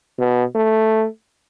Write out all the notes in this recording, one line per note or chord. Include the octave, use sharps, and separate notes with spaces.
B2
A3